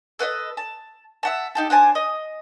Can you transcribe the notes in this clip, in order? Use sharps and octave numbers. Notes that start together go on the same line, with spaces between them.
A4 B4 C#5 D#5
A5
E5 F#5 A5
D#4 G4 A4
D4 C5 G#5 A5
D#5